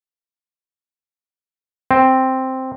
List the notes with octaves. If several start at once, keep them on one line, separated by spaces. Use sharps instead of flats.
C4